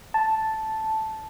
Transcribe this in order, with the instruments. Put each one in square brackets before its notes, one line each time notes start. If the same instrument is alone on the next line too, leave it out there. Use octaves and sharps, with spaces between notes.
[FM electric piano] A5